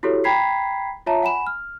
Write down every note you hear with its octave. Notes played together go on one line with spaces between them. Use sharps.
E4 F#4 G4 A4 C#5
G5 A#5 B5 G#6 B6 C7
F4 C#5 E5 A5 A#5
F#5 G#5 B5 E7
F6